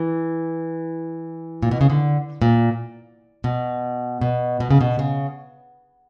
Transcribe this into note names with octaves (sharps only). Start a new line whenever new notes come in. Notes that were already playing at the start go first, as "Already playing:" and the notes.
Already playing: E3
A#2
B2
C#3
D3
A#2
B2
B2
B2
C#3
B2
C#3